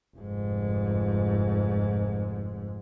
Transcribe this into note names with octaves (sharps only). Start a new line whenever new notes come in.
F1 G#2